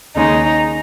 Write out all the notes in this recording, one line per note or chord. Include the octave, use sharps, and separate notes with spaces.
D#2 C#3 G#3 D#4